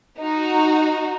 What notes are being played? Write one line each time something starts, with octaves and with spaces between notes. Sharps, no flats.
D#4 F#4